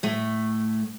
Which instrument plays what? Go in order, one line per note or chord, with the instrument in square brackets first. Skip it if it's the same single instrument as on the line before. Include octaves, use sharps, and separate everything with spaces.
[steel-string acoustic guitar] A2 A3